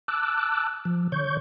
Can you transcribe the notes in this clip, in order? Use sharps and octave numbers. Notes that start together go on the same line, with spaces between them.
A5 D6 E6 F#6
F3
D3 C#5 C#6 G6